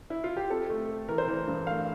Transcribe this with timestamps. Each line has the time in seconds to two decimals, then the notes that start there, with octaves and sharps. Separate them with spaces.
0.10 E4
0.24 F4
0.37 G4
0.50 C4 A4
0.70 A3
0.89 A3
1.08 E3 A#4
1.18 C5
1.28 E3 A#4
1.47 G2
1.67 A3 F5